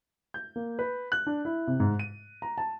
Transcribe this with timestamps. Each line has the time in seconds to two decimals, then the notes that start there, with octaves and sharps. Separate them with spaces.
0.34 G6
0.56 A#3
0.79 B4
1.12 F#6
1.27 D4
1.45 E4
1.67 C3
1.80 G#2
1.99 D#7
2.42 A#5
2.58 A5